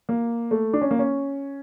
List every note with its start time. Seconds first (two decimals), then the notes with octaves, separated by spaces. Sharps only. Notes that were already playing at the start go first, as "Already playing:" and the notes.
0.09 A#3
0.51 A3
0.73 D4
0.81 C#4
0.91 A#3
0.99 C#4